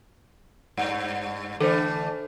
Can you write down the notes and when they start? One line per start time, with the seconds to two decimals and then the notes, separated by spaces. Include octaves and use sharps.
0.77 G2
1.60 D3 E3 A3 A4 C5